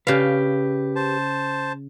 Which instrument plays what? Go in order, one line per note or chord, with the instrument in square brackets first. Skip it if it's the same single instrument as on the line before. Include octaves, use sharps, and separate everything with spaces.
[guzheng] C#3 F5 [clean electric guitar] G4 B4
[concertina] C5 A5